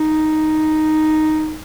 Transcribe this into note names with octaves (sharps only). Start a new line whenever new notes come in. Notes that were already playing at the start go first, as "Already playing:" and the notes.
Already playing: D#4